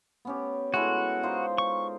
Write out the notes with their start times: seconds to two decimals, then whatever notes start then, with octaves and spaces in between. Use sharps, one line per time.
0.25 B3 C#4 G4
0.74 G#3 E4 F#4 A4
1.23 D#4 F4 C5
1.58 C#6